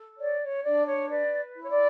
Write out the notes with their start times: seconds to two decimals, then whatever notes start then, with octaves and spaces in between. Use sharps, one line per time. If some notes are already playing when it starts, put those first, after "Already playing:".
Already playing: A4
0.18 C#5 D5
0.42 C#5
0.64 D4 D5
0.87 C#5
1.09 B4 D5
1.55 E4
1.62 C#5
1.70 D5